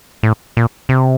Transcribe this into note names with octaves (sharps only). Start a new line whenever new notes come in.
A2
A#2
C3